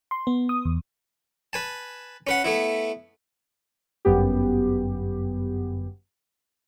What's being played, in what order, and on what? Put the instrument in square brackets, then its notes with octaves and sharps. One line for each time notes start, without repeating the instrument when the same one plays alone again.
[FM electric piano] C6
B3
D#6
E2
[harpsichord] B4 G#5 A5
C#4 B4 F#5
A3 B3 E4
[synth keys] G1 F#2 B3 G4